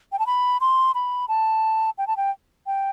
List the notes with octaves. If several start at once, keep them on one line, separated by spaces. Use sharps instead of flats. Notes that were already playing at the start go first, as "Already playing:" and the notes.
G5
A5
B5
C6
B5
A5
G5
A5
G5
G5